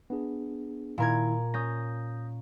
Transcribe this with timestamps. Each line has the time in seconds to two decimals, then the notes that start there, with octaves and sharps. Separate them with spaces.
0.10 B3 D4 G#4
0.98 A#2 D#3 E4 A#4 G#6
1.54 C#4 D#6 G6 A#6